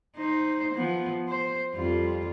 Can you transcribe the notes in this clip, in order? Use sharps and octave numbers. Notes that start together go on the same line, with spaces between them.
D#4 C5
F3 B3
C5
F2 G3 F4